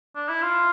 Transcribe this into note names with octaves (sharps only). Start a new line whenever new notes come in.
D4
E4
F4